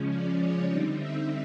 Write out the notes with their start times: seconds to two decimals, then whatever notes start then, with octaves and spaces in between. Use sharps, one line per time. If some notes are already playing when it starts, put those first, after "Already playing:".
Already playing: C#3 F3 G#3 C#4
0.09 D5
0.39 C#5
0.67 D3 G3 C4 D#4 D5
0.97 E5